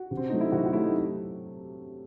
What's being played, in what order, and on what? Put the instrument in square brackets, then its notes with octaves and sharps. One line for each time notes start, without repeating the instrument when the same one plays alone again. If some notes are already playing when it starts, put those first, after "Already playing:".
Already playing: [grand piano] F#4
[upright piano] C3
[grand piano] C4
[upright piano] F#3 A3 [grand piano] D#4
[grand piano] E4
[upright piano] C3 [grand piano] F#4
[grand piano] F#4
[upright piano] F#3 A3 [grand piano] E4
[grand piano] D#4